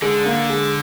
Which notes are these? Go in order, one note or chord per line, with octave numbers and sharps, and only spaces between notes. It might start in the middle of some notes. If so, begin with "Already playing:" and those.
D3 G#3
A#3
G#3